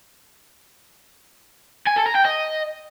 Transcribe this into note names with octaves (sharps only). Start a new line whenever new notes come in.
G#5
A4
A#5
G5
D#5